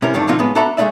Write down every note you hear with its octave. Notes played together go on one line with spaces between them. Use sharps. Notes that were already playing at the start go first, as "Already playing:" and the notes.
C3 C#4 E4 A#4
C2 G2 D#3 A3 D4
B2 D3 F3 C4 D#4 F4
A2 G#3 B3
D4 F#4 A4 E5 A#5 B5
G#3 A3 B3 D#4 D5 E5